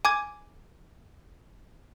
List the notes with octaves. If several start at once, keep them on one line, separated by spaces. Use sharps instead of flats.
G#5 D6 G#6